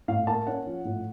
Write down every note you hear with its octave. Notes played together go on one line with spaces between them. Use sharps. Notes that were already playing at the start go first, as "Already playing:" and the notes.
A2 F5
A#3 A5
C#4 F#5
F3
A2